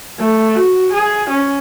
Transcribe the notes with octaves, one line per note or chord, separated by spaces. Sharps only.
A3
F#4
G#4
C#4